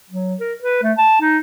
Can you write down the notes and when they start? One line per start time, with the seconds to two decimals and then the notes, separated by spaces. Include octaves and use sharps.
0.10 F#3
0.40 A#4
0.62 B4
0.83 A3
0.98 A5
1.21 D#4